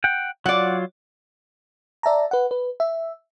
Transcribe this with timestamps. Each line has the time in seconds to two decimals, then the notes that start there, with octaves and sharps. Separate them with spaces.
0.04 F#5 G5
0.46 F#3 F4 D5 F#5
2.03 D5 E5 A5 A#5
2.31 B4 F#5
2.51 B4
2.80 E5